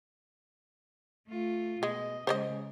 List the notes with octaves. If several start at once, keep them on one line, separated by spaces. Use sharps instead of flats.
A3 F4
B2 G#3 D#5
C#3 G#3 C5 C#5 D#5